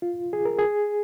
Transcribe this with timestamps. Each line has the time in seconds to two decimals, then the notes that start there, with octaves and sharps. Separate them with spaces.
0.02 F4
0.33 G#4
0.45 A#4
0.58 G#4